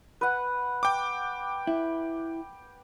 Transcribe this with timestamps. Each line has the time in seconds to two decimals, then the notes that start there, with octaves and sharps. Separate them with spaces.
0.21 B4 F#5
0.83 G5 D6
1.67 E4